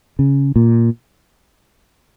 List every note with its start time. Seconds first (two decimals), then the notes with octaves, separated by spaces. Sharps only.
0.19 C#3
0.56 A#2